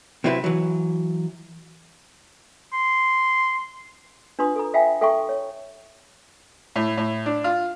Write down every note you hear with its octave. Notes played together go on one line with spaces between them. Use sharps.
C3 F#3 C4 E4 B4
E3 F#3
C6
D4 F4 B4 C6 D#6
A4 A#5
E5 F5 G5 G#5 B5
A4 E5 G5 A5 C6 C#6
C#5
A2
A2
D4
F4